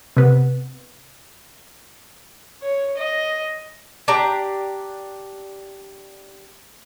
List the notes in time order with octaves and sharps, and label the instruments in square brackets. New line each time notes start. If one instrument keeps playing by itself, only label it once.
[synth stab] C3 B3
[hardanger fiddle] C#5
D#5
[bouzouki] D4 G4 A#5